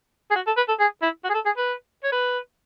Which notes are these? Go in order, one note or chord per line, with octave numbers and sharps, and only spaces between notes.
G#4
F#4
A4
B4
A4
G#4
E4
F#4
G#4
A4
G#4
B4
C#5
B4